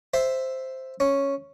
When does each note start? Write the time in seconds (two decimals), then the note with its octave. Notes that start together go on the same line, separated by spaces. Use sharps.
0.14 C5 E5
1.00 C#4